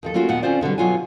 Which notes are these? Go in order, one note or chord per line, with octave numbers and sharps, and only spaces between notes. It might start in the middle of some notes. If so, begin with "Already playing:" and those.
D#2 F3 A4
A3 A#3 C#4 F4 F#4
D#2 A#2 B3 F#5
D3 C4 C#4 F4 C5 D5
B2 D3 F#3 G3
B2 F#3 B3 F4 C#5 G#5